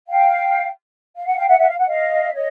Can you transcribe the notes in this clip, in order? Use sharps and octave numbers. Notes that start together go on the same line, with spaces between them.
F5 G5
F5
F#5
F5 G5
E5 F#5
E5 F#5
F5
F#5
D#5 F5
E5
C#5 D#5